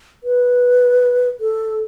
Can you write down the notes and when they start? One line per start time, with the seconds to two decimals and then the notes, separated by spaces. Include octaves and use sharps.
0.24 B4
1.40 A4